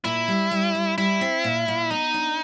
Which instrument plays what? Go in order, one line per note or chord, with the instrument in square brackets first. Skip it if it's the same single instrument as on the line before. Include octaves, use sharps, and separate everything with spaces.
[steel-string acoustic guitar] A#2 [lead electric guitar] E4
[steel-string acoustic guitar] G3
G3
G3
[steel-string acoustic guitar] G3 [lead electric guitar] E4
[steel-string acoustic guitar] C4
A#2
A#2
[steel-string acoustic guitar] B3 [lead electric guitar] D#4
[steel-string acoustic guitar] D4